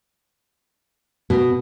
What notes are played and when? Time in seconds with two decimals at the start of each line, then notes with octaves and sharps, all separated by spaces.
1.30 B2